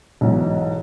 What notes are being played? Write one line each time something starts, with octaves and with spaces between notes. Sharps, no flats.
B1 G#2 E3